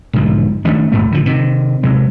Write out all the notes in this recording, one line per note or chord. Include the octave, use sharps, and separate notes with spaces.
B1 G#2 D3 F3
D#3 A3 C#4 D4
D#1 G#1 G#2 A3
D3 F3
C3 D#3
C3 F#3 G#3